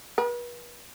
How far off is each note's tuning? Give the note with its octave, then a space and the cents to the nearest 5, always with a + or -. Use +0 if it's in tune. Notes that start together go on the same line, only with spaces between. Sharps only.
B4 -40